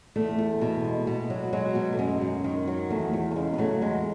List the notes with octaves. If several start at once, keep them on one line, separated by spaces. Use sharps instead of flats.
E2 A3
E2
B2
G#3
B2
F#3
F#3 G#3
B2
A3
F#2 G#3
F#2
D#3
F#3
E2 A3
E2
A3
C#3 G#3
B3
F#3 A3
E2 G#3